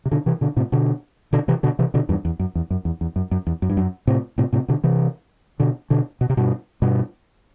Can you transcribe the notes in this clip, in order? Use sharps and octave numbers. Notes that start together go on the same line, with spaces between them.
C3
B2 D3
C3 E3
B2 D3
A2 C3
B2 D3
B2 D3
C3 E3
B2 D3
C3 E3
B2 D3
E2 G2
E2
F#2
E2
F#2
E2
E2
F#2
F#2
E2
F#2
G2
F#2
A2 C3
A2 C3
A2 C3
B2 D3
C3 E3
B2 D3
B2 D3
B2
C3
G2 B2
G2 B2